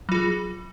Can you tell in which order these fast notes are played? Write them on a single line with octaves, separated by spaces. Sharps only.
F#3 F4 G#4